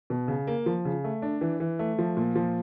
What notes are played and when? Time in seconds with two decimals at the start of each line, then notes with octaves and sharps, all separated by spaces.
0.10 B2
0.28 C#3
0.47 A#3
0.66 F3
0.85 C#3
1.04 A3
1.22 D4
1.41 E3
1.60 E3
1.79 A3
1.99 F3
2.17 A#2
2.36 F3